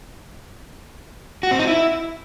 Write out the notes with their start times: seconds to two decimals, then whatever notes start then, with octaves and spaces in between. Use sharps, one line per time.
1.43 F#4
1.51 C4
1.59 D#4
1.67 E4